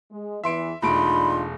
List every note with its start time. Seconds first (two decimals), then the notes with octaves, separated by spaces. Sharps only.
0.12 G#3
0.44 E2 E3 E5 C6 D7
0.82 E1 A3 D4 D#4 F4 B5 C6 D7